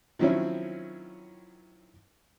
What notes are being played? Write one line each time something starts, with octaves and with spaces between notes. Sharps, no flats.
D#3 F3 F#3 C4 C#4 E4